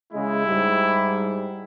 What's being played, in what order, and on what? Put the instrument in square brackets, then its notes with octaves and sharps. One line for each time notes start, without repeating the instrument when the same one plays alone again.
[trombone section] C#3 G#3 [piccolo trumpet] E4
[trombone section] G#2 G3